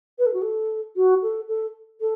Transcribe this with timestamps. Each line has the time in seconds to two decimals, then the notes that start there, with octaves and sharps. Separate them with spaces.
0.18 B4
0.25 A4
0.33 F#4
0.41 A4
0.96 F#4
1.22 A4
1.47 A4
2.00 A4